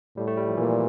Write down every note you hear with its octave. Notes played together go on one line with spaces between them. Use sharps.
A2 G3
A3
G3
F3
A#2 E3